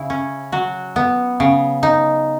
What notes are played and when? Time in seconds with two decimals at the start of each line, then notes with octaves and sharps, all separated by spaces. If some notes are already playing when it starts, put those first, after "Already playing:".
Already playing: C#3 E4
0.10 C#4
0.52 F#3 F#4
0.96 B3
1.40 C#3
1.83 D#4